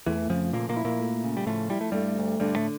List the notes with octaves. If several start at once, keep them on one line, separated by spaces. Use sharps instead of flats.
E2 E3 A3
F2 C#3 F3
A#2 F3 A#3
A#2 A#3
E4
A#2 A#3
A3
C#3
G3
A2 F3 A3
G3 E4
A3
G2 G3 A3
D2
G2 D3 G3
A2 A3